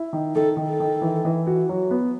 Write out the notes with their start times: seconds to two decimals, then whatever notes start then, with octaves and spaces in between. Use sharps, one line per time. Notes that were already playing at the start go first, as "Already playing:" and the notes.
Already playing: E4
0.13 D#3
0.35 D#3 A4
0.57 D#3
0.69 A4
0.80 D#3
1.02 E3
1.25 E3
1.47 F#4
1.69 F#3
1.91 B3